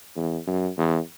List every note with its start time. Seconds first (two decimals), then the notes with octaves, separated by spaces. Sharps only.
0.16 E2
0.47 F#2
0.77 E2